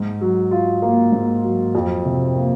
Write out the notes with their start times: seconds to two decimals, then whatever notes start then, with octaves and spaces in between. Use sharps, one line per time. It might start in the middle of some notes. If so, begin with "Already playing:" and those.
Already playing: G#2
0.21 F#3
0.51 F4
0.82 A#3
1.12 G#2
1.44 F#3
1.75 F2
2.05 C3
2.35 A#3